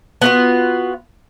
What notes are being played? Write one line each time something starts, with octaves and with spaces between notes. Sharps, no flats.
B3 F4 F#4